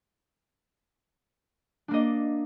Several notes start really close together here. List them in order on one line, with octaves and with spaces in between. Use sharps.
D4 A#3 D#5